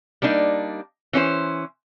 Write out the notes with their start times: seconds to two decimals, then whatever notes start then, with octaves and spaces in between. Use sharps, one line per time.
0.22 G3 A#3 D4 D#4
1.13 E3 C#4 D#4 C5